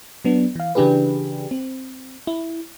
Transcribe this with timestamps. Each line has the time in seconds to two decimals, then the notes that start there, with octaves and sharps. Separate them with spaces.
0.25 F#3 B3 D4
0.56 E3 F5
0.75 C#3 E3 D4 G4 G#4 B4
1.51 C4
2.27 E4